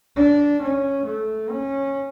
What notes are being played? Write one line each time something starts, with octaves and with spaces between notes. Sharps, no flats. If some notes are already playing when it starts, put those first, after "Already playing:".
D4
C#4
A3
C#4